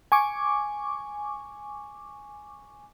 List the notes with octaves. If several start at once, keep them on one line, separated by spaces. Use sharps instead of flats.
G#5 C#6 D6